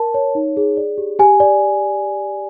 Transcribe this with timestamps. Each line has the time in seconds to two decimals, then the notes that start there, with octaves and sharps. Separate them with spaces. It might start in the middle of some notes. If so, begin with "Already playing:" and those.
Already playing: A#4 A5
0.14 C#5
0.35 D#4
0.57 G#4
0.77 D5
0.98 G4
1.19 G4 G#5
1.40 D5